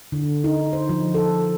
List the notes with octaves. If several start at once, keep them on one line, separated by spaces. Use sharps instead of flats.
D3
D#4
C5
F3
A4